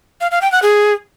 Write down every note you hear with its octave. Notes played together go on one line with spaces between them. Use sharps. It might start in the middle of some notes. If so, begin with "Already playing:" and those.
F5
F5
G5
F#5
G#4